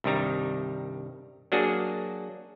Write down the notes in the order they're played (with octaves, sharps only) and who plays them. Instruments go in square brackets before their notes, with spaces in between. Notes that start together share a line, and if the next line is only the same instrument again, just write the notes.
[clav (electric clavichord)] C2 G2 D#3 G3 A#5
F#3 A#3 D4 F#4 G#4